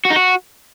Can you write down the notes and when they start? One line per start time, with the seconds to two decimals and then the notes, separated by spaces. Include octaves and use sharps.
0.05 F#4
0.10 D#4
0.16 F#4